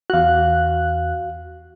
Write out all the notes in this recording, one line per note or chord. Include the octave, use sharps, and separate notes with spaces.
E2 F#4 F5 F#6